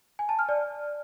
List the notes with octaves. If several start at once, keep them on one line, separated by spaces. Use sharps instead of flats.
G#5
A5
F6
D5